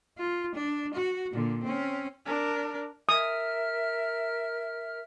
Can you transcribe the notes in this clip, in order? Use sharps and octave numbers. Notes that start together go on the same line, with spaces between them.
F4
D4
F#4
A#2 D3
C4 C#4
D4 A#4
A#4 E5 D#6 F6